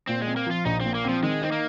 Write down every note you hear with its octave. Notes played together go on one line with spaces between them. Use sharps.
A#2 C4
G#3
C4
A#3
F3 F4
A#1 D#4
A#2 C4
A#3
F3 C4
D#3 G#3
C4 D#4
A#3